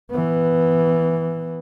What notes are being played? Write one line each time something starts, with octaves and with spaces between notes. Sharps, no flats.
E3 B3